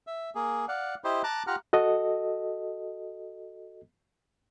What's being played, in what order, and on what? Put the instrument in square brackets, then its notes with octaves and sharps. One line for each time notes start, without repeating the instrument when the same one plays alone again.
[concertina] E5
A#3 G#4
D5 F5 F#5
E4 G4 C5 D#5 C6
A5 A#5 D6 F#6
F4 G4 F#5 A#5 F6
[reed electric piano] F#4 A4 D#5